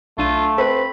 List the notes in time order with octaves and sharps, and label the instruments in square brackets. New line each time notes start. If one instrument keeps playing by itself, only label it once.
[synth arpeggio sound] B1 D4 D#7 [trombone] A3 [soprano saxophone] F4
[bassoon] C4 [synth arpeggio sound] A4 B4 [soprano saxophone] B5